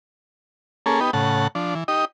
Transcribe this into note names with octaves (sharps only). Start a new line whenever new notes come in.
A#3 C#4 G#4 A4
B3 D#4 G4
A2 C#3 F#5 A5
F3 D4
E3
D#4 G4 D#5